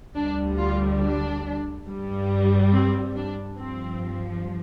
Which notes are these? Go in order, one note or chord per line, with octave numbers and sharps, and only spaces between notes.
D2 D3 G3 D4
F4
D4
G2 G3
C4
D4
G2 F3 C4